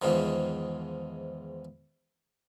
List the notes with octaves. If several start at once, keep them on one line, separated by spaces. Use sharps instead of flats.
E2 G#2 D#3 F3